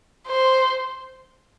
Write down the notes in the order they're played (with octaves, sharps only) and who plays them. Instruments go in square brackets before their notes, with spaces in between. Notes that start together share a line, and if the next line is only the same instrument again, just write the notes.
[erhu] C5